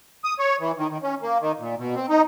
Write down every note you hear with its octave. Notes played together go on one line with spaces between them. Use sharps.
D#6
C#5
E3
D#3
D#3
C#4
A#3
D#3
A#2
B2
C4
D#4